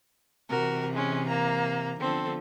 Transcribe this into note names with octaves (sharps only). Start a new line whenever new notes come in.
C3 E3 F#4 A#4
G#3 C#4
A#3 A#5
D3 F3 B3 C4 A4